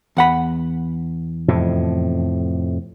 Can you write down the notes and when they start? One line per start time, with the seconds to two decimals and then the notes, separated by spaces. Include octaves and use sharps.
0.17 E2 F#5 B5
1.48 F2 A2 C3